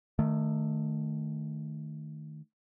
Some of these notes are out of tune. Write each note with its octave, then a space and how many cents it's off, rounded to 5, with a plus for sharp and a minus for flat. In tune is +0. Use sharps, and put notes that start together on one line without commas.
D#3 -20 A3 +0